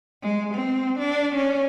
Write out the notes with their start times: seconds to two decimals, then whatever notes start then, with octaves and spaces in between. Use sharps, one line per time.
0.23 G#3
0.54 C4
0.99 D4
1.35 C#4